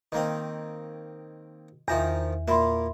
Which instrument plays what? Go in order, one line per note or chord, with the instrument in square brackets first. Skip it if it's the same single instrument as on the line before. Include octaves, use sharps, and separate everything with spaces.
[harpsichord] D#3 A#3 C4 [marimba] D#5
[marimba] E2 E5 [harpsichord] D#3 F3 A#5
[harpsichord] A#2 A#3 [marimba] E5 B5 C6